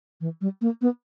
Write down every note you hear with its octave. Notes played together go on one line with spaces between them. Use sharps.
E3
G3
A#3
B3